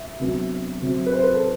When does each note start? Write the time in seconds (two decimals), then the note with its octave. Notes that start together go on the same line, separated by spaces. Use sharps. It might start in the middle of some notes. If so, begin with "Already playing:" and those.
Already playing: E5
0.20 C3 F#3 B3 D4
0.82 C3 F#3 C4
1.06 B4
1.13 C5
1.24 B4
1.34 A4